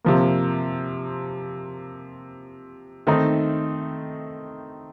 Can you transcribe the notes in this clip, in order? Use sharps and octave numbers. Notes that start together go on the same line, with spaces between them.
C3 F3 A#3
D#3 A3 C4 D#4